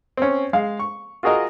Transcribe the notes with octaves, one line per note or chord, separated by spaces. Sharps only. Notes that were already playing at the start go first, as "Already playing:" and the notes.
C4 C#4
G#3 F5
C#6
F4 F#4 G#4 A#4 D#5